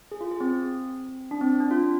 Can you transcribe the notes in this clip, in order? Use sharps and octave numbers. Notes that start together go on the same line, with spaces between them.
G#4
F4
G#4
C4
D4
C4
D4
F4